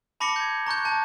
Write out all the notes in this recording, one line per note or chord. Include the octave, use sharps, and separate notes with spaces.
A5 B5 D6 A#6 C#7 G7
G6 G#6
A#5 C#6 F#6 G6
A5 G6